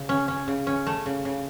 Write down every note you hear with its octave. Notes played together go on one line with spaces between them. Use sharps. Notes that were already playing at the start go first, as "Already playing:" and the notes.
Already playing: C#3
C#4
C#4
C#3
C#4
A3
C#3
C#3